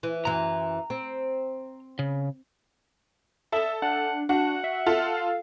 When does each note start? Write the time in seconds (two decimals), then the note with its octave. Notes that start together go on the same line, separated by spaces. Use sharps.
0.03 E3
0.25 F#2 E3 A#5
0.90 C4
1.99 C#3
3.52 A4 E5
3.82 D4 F#5
4.29 D4 F#4 F#5
4.64 E5
4.86 F4 A4
5.17 F5